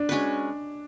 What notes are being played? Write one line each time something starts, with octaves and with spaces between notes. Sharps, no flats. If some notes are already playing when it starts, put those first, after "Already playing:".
Already playing: D4
G#3 C#4 F#4 B4